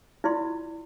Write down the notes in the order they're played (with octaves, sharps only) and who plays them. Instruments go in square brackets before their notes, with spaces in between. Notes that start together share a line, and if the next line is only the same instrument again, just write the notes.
[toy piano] E4 F4 D5 C6